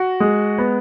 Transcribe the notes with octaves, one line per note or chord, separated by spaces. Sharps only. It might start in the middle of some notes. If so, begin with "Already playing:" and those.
Already playing: F#4
G#3
B3